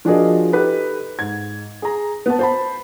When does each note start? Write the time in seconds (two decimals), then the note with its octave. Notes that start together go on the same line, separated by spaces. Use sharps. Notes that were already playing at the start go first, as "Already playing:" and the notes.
0.05 F3 D4 F#4 G#4 A#4 D#5
0.52 D#4 G4 A4 B4
1.19 G#2 G#6
1.82 G#4 A#5
2.26 B3 A5
2.39 C5 A5 B5